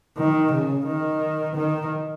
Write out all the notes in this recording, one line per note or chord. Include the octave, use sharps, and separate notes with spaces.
D#3
C#3
D#3
D#3